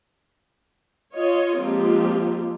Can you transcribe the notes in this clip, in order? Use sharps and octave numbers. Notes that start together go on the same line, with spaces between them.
F4 C#5 D#5
F3 G#3 A#3 C4 F4 G4